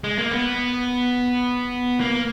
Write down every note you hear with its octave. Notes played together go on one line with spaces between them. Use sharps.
G#3
A#3
B3
A#3